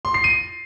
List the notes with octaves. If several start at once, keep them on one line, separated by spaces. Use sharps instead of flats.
C6
C7
D#7